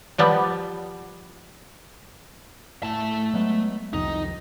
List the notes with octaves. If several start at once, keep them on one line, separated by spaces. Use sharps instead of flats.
F3 G3 B3
A2 A3 A5
F#3 G#3 B3
C2 F2 D#3 D#4